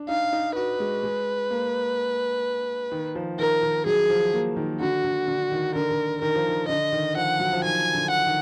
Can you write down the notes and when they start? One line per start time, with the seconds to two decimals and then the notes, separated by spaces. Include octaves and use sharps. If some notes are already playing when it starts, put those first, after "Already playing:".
Already playing: D4
0.09 D#4 F5
0.33 D#4
0.56 F#4 B4
0.80 G#3
1.03 G#3
1.51 A#3
2.92 D#3
3.15 F3
3.39 D#3 A#4
3.63 D#3
3.86 F#3 G#4
4.10 F3
4.33 A#3
4.56 D#3
4.81 D3 F#4
5.04 D3
5.28 D3
5.52 D#3
5.75 D3 A#4
5.91 D3
6.22 D#3 A#4
6.35 F3
6.48 D#3
6.69 D3 D#5
6.92 D#3
7.16 F3 F#5
7.40 F#3
7.53 F3
7.64 D#3 G#5
7.94 D3
8.11 F#5
8.26 D#3